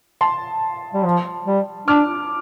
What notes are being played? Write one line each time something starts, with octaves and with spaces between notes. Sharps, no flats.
A5 C6
G3
F3
G3
D4 D6 F6